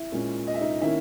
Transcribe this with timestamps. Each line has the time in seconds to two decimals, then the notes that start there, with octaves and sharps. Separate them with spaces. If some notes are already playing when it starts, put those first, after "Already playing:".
Already playing: E4 E5
0.12 A#2 G#3 C#4
0.47 D#5
0.54 E5
0.61 D#4 D#5
0.81 D#3 A#3 C#4 E4 E5